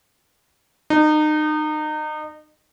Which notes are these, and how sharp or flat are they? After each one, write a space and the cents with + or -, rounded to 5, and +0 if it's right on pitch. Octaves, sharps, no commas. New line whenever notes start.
D#4 -30